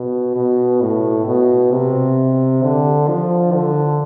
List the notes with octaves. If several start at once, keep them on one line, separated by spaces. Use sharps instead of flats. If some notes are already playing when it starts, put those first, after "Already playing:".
Already playing: B2
B2
A2
B2
C3
D3
F3
D3